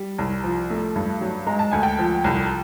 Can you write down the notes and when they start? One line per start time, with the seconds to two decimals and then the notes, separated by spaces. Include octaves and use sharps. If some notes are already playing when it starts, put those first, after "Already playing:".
Already playing: G3
0.18 C2
0.44 F3
0.70 A3
0.96 G2
1.21 F#3
1.47 G#3 A#5
1.59 A5
1.71 D2 G#5
1.83 G5 A5
1.99 F3
2.24 C2